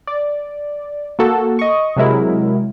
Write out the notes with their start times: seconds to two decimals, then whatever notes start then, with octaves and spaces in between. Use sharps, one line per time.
0.07 D5
1.19 A#3 F#4 A4
1.59 D#5 C#6
1.96 C3 F#3 G#3 E4 A#4